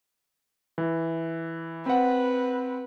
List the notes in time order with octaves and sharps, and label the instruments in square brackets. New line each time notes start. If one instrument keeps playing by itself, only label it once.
[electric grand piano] E3
[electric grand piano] C4 F#5 [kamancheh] B4